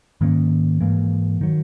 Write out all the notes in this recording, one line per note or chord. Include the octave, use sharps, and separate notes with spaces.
G#2 D#3 A#3 C#4
G#2 E3 A#3
D#3 F#3